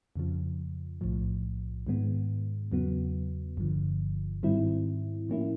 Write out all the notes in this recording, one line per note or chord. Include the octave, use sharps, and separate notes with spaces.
F2 C#3 F3
B1 A2 F3
G#2 D#3 G#3 B3
E2 C#3 F#3 B3
G1 G2 D3 F3
G#2 D#3 G3 C4 E4
A2 F3 A#3 C#4 E4